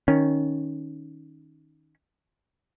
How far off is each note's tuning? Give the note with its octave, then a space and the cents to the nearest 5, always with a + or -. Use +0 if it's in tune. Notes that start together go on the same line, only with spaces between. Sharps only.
D#3 +0 C#4 +0